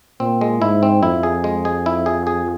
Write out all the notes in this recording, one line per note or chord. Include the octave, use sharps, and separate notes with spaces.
A#2 C4
G#3
G#2 E4
C4
F2 E4
G#4
G#3
G#4
E4
G#4
G#4